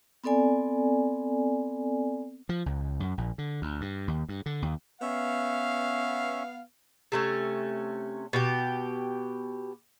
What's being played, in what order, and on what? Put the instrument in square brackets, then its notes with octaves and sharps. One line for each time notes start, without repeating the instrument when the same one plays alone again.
[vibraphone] B3 C4 A4 D5 G#5
[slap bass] F3
C#2
F#2
A#1
D3
D2
G2
D#2
G2
D3
D#2
[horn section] B3 F5 [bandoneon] C#4 E5
[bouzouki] C3 A3 C#4
B2 G4